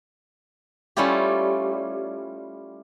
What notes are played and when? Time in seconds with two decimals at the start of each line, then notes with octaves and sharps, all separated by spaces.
0.97 G3 A3 C#4 E4 F4 G4